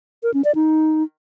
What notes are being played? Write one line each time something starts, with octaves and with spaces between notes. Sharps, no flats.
A#4
C#4
D5
D#4